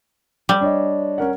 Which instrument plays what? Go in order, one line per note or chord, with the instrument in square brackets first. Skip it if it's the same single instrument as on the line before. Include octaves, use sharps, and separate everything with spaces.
[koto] G3
[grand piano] D4 C#5 D#5
C#4 A#4 F#5